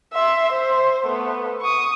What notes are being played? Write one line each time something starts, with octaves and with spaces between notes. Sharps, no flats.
E5 C6
C5
A3 B3
C#6 D#6